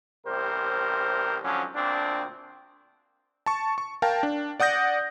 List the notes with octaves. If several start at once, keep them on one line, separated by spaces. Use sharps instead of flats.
A1 C3 G3 A#4 C5
G#1 D3 F3 F#3 C#4
D2 A#2 C4 D4
A5 C#6
C#6
A#4 F5 G5 A5
D4
D5 F#5 D#6 G6 A#6